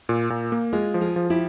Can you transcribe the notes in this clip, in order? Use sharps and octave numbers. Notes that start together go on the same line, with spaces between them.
A#2
A#2
A#3
G#3 F4 G#4
F3
F4 G#4
F3
E4 G4